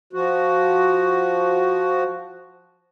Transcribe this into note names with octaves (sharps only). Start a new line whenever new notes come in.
F3 F#4